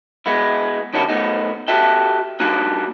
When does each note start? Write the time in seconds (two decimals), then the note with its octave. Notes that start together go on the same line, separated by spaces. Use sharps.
0.26 G#3 B3 E4
0.94 D#3 C#4 D4 E4 F#4 G4
1.09 A3 B3 D#4
1.68 F#4 G4 A4 E5 G5
2.40 G3 A#3 D4 D#4 F#4